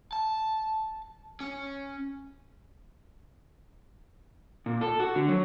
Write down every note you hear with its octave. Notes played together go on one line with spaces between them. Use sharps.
A5
C#4
A#2
A4
F#4
D3
F#3